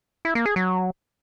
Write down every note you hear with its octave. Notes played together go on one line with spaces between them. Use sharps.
E4
A#3
G#4
F#3